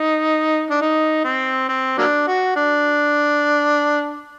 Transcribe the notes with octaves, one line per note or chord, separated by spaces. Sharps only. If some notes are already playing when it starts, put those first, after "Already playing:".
Already playing: D#4
D4
D#4
C4
C4
F#3 A#3 D4
F#4
D4